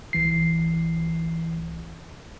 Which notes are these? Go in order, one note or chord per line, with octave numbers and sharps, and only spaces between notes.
C2 E3 C7